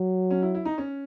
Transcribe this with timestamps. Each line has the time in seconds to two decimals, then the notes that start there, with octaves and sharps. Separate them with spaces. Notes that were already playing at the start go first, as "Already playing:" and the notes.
Already playing: F#3
0.31 C#4
0.42 E4
0.55 E4
0.65 D#4
0.78 C#4